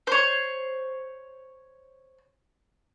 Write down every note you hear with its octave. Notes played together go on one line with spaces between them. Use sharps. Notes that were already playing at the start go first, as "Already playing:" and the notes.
C5 C#5